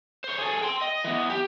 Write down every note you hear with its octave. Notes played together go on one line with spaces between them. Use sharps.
C5 C#5
G#4 A4
G5 C6
D#5
E3 B3
G4